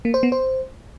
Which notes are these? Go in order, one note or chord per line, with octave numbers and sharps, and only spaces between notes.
A#3
C5
B3
C5